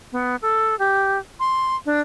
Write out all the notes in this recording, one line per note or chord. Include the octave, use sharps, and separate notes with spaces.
B3
A4
G4
C6
D4